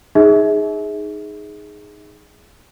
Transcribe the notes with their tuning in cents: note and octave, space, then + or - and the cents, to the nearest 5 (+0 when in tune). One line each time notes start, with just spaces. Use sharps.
D#4 +0 G#4 +0 E5 -40